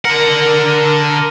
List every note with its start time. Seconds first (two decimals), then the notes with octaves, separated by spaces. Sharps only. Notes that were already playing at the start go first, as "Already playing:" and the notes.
0.05 D3 A#4 F#5